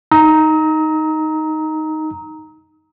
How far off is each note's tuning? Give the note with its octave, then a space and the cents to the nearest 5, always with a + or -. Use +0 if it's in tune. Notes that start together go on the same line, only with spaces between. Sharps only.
D#4 +5 A#5 +0 D#6 +45